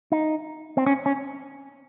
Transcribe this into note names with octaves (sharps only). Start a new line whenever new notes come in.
D#4
C4
C#4
C#4